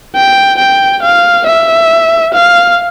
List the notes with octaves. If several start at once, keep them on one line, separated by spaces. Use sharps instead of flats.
G5
G5
F5
E5
F5